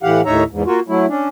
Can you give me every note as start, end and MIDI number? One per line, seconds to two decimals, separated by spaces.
0.03 0.21 45
0.03 0.21 52
0.03 0.21 67
0.03 0.21 77
0.03 0.21 78
0.25 0.44 39
0.25 0.44 45
0.25 0.44 63
0.25 0.44 73
0.25 0.44 76
0.25 0.44 82
0.51 0.63 40
0.51 0.63 44
0.66 0.80 58
0.66 0.80 65
0.66 0.80 66
0.88 1.06 54
0.88 1.06 57
0.88 1.06 64
1.08 1.28 61
1.08 1.28 62